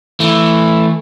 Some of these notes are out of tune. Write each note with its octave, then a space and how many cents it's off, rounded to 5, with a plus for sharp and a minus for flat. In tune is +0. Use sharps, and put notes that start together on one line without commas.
E3 +0 A3 +0